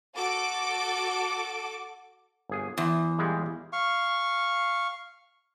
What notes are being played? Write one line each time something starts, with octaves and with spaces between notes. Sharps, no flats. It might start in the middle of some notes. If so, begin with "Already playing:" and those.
F#4 A4 D6
G1 G#4
E2 C5
A#2 G3 G#3
F5 C#6